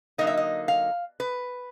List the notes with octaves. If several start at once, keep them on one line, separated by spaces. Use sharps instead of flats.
D3 F#3 A#3 D#4 D#5
E5
D#5
F5
B4